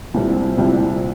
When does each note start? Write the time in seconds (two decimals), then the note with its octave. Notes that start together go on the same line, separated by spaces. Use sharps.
0.14 C2 A#2 G3 C4 E4
0.58 C2 A#2 G3 C4 E4